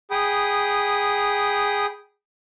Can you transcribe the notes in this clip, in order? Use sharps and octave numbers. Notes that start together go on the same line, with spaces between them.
G#4 G5 B5 D#6